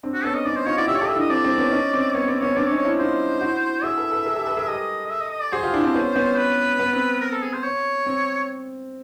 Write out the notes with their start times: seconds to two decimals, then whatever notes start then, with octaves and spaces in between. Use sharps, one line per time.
0.03 C4 D4
0.14 F#4
0.24 B3 C#4 A4
0.35 D#5
0.45 C#4 D#4 D5
0.56 C5
0.67 D#4 F4 C#5
0.77 E4 F#4 D5
0.88 F4 G4 E5
0.94 C#5
0.98 G4 A4 D5
1.09 E5
1.16 D4 E4 D#5
1.30 C4 D4 D5
1.44 C4
1.58 B3 C#4
1.72 C#4 D#4
1.94 C4
2.14 B3 C#5
2.28 C4 D5
2.40 B3 C#4 C#5
2.56 C4 D4 D5
2.67 C#5
2.71 C#4 D#4
2.78 C#5
2.85 D4 E4
2.98 D#4 F4 C5
3.41 E4 F#4
3.83 F#4 G#4 E5
3.97 A4 B4
4.12 A4 B4
4.25 G#4 A#4
4.36 G4 A4
4.47 A4 B4
4.57 G#4 A#4
4.68 G4 A4 D#5
5.06 D#5
5.10 E5
5.21 D#5
5.31 D#5
5.42 D5
5.52 F#4 G#4 C5
5.63 F4 G4
5.73 D4 E4
5.85 C4 D4
5.95 B3 C#4
6.16 B3 C#4
6.37 B4
6.79 B3
6.93 C4
7.21 A#4
7.32 A4
7.42 G#4
7.53 C5
7.64 C#5
8.06 C4